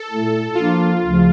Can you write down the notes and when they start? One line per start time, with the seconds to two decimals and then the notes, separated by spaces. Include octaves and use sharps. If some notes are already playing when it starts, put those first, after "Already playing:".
Already playing: A4
0.09 A#2 A3 E4
0.55 F3 A#3 D4 F4 A4
1.02 D2 C#3 F3